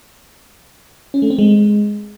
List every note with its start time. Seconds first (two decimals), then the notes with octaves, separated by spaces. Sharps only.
1.14 C#4
1.22 A3
1.30 C4
1.39 G#3